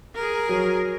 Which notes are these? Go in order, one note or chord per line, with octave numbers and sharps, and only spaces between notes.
G#4 A#4
F#3